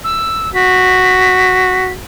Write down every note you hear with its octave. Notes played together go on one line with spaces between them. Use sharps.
E6
F#4 B6